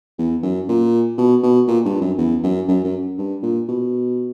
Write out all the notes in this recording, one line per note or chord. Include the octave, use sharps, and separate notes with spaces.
E2
F#2
A#2
B2
B2
A#2
G2
F#2
E2
F#2
F#2
F#2
G2
A#2
B2